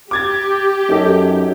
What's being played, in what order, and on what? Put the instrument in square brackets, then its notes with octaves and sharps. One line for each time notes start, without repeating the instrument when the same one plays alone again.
[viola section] G4 [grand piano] D6 G#6 A6
[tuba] F#2 [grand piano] D#4 A4